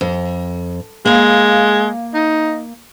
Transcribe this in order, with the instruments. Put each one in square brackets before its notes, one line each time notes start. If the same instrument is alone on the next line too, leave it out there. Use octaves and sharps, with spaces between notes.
[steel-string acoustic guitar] F2
[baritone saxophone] G#3 [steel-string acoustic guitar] A#3 F5
[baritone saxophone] D#4